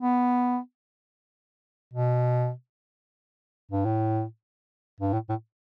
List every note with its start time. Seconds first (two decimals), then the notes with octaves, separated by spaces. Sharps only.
0.01 B3
1.93 B2
3.71 G2
3.85 A2
5.00 G2
5.13 A2
5.29 A2